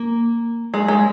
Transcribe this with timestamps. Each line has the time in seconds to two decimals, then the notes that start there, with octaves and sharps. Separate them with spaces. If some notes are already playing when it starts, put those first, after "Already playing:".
Already playing: A#3
0.74 G#3
0.88 G#3